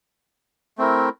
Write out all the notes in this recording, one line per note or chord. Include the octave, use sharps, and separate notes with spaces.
A3 C4 E4 A#4